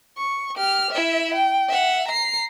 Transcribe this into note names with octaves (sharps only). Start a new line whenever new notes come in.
C#6
G4 F6
E4 E5
G5
E5 F#5
A#5 C7